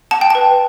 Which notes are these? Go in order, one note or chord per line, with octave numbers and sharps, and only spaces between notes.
F#5 A5
G5
B4 A5